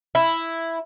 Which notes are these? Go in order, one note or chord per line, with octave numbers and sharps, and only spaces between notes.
E4